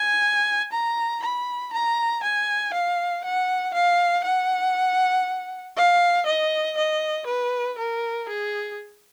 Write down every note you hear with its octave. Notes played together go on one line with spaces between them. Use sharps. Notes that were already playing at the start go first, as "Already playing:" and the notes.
Already playing: G#5
A#5
B5
A#5
G#5
F5
F#5
F5
F#5
F5
D#5
D#5
B4
A#4
G#4